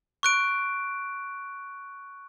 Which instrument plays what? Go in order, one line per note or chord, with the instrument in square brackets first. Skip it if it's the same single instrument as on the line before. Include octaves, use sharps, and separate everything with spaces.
[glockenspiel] C#6 F#6 D7